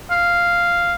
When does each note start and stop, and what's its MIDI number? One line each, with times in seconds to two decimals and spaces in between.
0.11 0.95 77